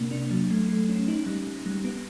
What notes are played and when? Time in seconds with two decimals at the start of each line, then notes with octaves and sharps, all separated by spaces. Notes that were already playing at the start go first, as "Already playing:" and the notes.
Already playing: C3 A#3 D4
0.11 D4
0.31 F#3
0.51 A3
0.69 A3
0.89 C#4
1.08 D#4
1.26 G3
1.47 G3
1.66 G3
1.85 B3